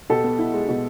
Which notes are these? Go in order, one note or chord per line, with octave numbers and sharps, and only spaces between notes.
B2 G4 A4
B3
E4
G#3
B2